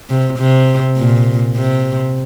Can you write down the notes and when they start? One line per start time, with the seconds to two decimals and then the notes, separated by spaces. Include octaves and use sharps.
0.09 C3
0.39 C3
0.97 A#2
1.55 C3